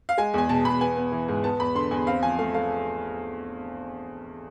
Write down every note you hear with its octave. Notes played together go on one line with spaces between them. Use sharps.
F5
G#3 G#5
E2 G#5
B2 A5
E2 B5
B3 G#5
B3
E3
G#2
B3 A5
E2 B5
D3 C6
E2 G#5
C4 F5
F3 G#5
A3 F5
A3 F5